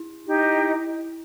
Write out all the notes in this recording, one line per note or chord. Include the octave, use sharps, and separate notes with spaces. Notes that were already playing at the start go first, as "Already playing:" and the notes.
Already playing: E4
D#4 G4 D#5